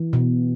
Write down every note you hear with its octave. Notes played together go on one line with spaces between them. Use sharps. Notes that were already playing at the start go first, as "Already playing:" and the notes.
Already playing: E3
B2